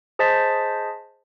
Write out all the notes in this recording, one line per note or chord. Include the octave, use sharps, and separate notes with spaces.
G#4 C5 D#5 A5 A6 B6